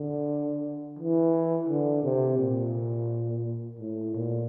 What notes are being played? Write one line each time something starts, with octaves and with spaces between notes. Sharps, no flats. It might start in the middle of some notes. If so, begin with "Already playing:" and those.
Already playing: D3
E3
D3
C3
A#2
A2
A#2